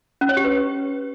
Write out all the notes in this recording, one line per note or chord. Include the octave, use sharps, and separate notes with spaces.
C#4
C#5
G4
B4